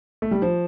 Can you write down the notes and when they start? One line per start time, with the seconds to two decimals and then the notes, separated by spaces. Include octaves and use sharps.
0.22 A3
0.31 G3
0.42 F3